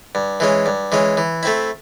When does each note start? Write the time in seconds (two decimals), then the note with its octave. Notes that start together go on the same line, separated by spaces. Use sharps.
0.15 G2
0.40 E3 G#3 C#4
0.66 G2
0.92 E3 G#3 C#4
1.17 E3
1.43 A3 C4 E4